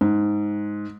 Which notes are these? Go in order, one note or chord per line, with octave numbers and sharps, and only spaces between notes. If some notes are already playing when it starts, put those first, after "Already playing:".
G#2